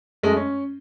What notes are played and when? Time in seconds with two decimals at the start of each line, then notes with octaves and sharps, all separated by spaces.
0.23 F#2 G#3 A3 D#5
0.36 C#4